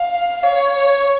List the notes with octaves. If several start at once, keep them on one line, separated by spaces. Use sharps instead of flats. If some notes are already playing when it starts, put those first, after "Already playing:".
Already playing: F5
C#5